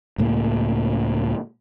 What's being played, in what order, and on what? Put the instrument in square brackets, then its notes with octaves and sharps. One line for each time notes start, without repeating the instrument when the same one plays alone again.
[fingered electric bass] C#2 A2 A#3